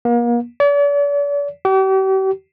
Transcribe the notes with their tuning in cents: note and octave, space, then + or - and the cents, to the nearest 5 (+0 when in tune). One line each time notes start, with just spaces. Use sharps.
A#3 +35
D5 -45
G4 -40